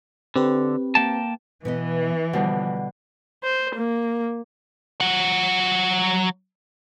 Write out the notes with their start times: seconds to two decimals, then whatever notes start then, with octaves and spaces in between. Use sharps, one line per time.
0.36 D3 C4 G4 B4
0.95 A#3 G5 A5
1.65 B2 E3 B3 D#5
2.33 B2 D3 F3 G3
3.43 C5
3.76 A#3
5.01 F#3 F#5